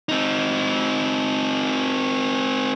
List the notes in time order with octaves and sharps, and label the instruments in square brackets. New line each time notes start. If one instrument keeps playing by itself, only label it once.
[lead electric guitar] C4 D#4